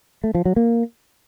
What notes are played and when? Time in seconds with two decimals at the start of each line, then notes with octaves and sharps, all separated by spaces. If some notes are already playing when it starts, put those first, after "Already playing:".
0.24 A3
0.35 F3
0.45 F#3
0.56 A#3